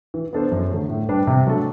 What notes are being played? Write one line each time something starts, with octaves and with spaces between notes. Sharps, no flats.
E3
B3 D4 A4 C5
F#2
D3 A3
A2
G3 D4 G4 B4
C3
F#3 A3 D4 A4